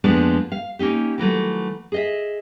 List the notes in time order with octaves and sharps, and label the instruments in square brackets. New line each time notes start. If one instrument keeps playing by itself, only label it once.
[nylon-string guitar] F2 F3 G#3 A#3 B3 D4
F5
A#3 C#4 D#4 G4
D#3 E3 F#3 A3
G#4 D#5 E5